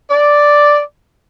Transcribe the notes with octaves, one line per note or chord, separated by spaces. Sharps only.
D5